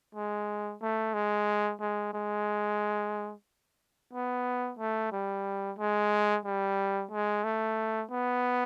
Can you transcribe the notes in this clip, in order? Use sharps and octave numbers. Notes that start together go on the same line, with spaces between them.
G#3
A3
G#3
G#3
G#3
B3
A3
G3
G#3
G3
G#3
A3
B3